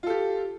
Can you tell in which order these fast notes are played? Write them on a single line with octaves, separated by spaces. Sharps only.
F4 A4 G4